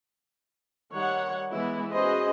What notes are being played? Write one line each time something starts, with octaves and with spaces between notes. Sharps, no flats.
D#3 G3 C#5 F#5
E3 G#3 B3 E4
C#4 F#4 G#4 B4 C5 D#5